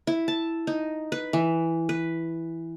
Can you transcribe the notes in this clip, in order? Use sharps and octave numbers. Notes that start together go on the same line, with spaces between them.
E4
A5
D#4
B4
E3
B4